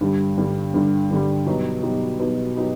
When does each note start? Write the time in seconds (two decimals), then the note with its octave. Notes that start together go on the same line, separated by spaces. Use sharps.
0.01 G2 D3 G3
0.38 G2 D3 G3
0.74 G2 D3 G3
1.11 G2 D3 G3
1.46 B2 F#3 B3 D#4 G4
1.83 B2 F#3 B3 D#4 G4
2.20 B2 F#3 B3 D#4 G4
2.57 F#3 B3 D#4 G4